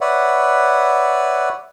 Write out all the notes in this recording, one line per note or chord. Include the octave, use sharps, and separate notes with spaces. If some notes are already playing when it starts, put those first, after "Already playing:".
B4 C#5 D5 E5 F#5